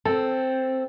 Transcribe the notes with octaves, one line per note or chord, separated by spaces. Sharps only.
C4 A4